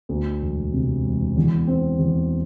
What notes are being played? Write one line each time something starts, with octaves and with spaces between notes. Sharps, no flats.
D2
E1
C3
E1
E2
C4
E2